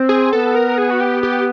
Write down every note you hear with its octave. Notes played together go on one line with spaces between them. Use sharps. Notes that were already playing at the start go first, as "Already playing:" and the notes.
Already playing: C4
G#4
B3 A4
A#4
G#4
F#4
G4
G4